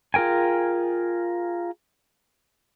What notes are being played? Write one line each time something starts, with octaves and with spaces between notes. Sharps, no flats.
F4 G#4 A#4 G5 G#5